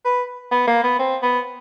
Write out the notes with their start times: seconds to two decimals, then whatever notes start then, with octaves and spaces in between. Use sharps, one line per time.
0.05 B4
0.51 B3
0.68 A#3
0.83 B3
0.99 C4
1.22 B3